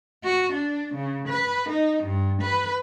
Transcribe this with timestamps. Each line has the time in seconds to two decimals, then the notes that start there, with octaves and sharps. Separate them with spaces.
0.24 F#4
0.53 D4
0.95 C#3
1.28 B4
1.69 D#4
2.03 G2
2.42 B4